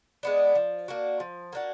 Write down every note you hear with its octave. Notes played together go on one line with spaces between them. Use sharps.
G#3 B3 D4
F3
A#3 D4 F#4
F3
A#3 D4 F#4